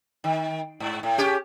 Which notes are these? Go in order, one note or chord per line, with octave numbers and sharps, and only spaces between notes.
D#3
G#2
A2
C#4 G4